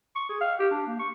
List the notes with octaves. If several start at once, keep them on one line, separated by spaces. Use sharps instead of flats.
C#6
G#4
F5
G4
D4
A#3
C#6